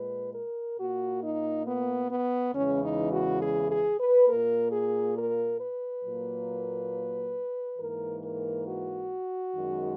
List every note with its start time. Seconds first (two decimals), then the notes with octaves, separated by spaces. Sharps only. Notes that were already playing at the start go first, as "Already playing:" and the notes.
Already playing: A#2 G#3 B4
0.33 A#4
0.78 A#2 A#3 F#4
1.22 D#4
1.65 B3
2.09 B3
2.53 E2 C#3 E3 G#3 C#4
2.82 D#4
3.11 F#4
3.41 G#4
3.70 G#4
3.98 B4
4.28 A#2 A#3 A#4
4.72 G#4
5.16 A#4
5.59 B4
6.03 A#2 F#3 A#3
7.78 G#2 E3 A#3 A#4
8.22 A#4
8.66 F#4
9.53 F#2 D#3 G#3